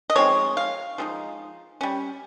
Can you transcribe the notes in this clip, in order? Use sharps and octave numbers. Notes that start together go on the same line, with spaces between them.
D#5
F3 G#3 C4 D#4 C#5
F5
F3 G#3 C4 D#4
G3 C#4